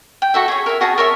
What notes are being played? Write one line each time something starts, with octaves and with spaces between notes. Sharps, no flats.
G5
F#4 A4 E5
G#4 C#5
A#4 E5
F#4 G#4 A5 A#5
A#4 C#5 E5